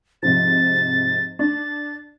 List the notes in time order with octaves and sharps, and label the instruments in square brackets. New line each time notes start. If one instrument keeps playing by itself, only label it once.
[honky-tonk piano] G#2 C3 F3 [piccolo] A6
[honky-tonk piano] D4 [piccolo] A6